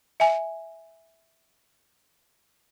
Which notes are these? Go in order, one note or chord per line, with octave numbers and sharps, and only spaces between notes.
E5 G#5